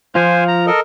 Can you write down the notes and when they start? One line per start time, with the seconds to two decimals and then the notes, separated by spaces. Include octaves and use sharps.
0.15 F3 F4 C5 G#5
0.48 A#5
0.67 A4 A#4 D#5